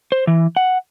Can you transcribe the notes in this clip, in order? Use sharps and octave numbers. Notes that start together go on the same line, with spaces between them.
C5
E3
F#5